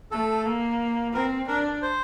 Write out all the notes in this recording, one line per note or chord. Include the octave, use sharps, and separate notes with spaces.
A3 A4
A#3
C4 A#4
D4 A#4
C5